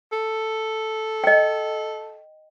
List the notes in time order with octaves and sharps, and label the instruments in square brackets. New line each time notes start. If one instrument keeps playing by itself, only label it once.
[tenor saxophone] A4
[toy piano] D#5 G5